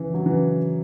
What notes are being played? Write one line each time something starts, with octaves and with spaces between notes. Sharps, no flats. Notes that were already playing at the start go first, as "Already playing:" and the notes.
Already playing: C#3 E3
F#3
C#3 E3